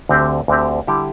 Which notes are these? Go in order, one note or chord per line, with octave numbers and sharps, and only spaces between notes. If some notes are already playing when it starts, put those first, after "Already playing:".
D2 D3 C4 G4
D2 D3 C4 G4
D3 G3 E4 G4